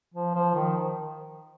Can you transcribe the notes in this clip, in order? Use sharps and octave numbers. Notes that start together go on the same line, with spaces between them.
F3
F3
D#3